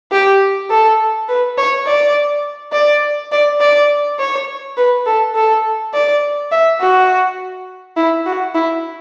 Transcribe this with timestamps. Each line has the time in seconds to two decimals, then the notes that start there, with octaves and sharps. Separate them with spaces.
0.12 G4
0.70 A4
1.29 B4
1.58 C#5
1.86 D5
2.73 D5
3.32 D5
3.61 D5
4.19 C#5
4.77 B4
5.06 A4
5.35 A4
5.94 D5
6.52 E5
6.81 F#4
7.97 E4
8.26 F#4
8.55 E4